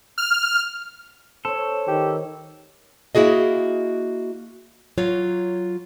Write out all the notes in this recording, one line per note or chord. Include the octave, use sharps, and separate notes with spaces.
F6
A4 C5 C#5
D#3 G4
A#3 E4 F#4 G#4 D#5
F#3 F4 C#5